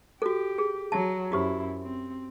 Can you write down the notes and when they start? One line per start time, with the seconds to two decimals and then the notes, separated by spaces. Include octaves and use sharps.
0.22 F#4 G4 A4
0.58 G#4
0.92 F#3 A5
1.32 F#2 E4 F#4 G4 C5
1.83 C4